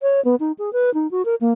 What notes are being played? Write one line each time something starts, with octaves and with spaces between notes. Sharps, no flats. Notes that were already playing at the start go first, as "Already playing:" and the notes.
C#5
B3
D#4
G#4
B4
D#4
F#4
A#4
A#3